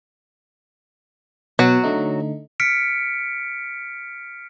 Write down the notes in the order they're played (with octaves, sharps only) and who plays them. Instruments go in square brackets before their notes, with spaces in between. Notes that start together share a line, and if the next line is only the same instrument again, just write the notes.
[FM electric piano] B2 [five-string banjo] F#3 F#4
[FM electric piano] D3 A3 D#4
[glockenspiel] F6 B6 C#7 D7